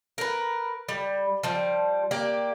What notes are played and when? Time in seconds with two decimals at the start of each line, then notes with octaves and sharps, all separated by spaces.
0.18 A#4 B4
0.89 G3
1.43 F3 G3
2.11 A#3 G4 D5